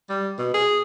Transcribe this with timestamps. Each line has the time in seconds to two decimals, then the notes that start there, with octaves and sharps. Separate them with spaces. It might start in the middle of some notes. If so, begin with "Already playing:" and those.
0.09 G3
0.38 B2
0.54 G#4